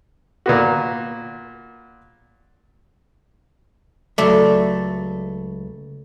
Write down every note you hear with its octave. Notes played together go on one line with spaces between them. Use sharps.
A#2 B3 F#4
C#2 F#3 A3 D5